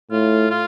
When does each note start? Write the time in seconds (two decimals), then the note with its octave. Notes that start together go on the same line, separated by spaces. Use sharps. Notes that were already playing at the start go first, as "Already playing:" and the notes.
0.11 A2 F4
0.50 F4